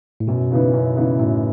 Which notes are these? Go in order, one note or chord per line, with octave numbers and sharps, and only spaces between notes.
A2
F#2 B2
C#3 E3 B3 D#4
F#2
C#3 E3 B3 D#4
F#2 A2